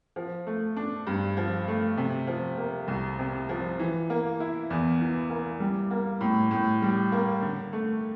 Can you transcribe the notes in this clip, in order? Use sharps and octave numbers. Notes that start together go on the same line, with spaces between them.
F3
A3
D4
G2
F3
A3
C3
F3
A#3
C2
C3
F3
E3
A#3
E4
E2
E3
A#3
G3
A#3
A2
A2
G3
A#3
D3
A3